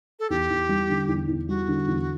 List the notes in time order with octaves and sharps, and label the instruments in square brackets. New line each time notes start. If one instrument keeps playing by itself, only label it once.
[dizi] A4
[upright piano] E2 [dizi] G4
[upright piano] E2
G3
D3
E2
E2
[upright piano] G3 [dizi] F#4
[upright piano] D3
E2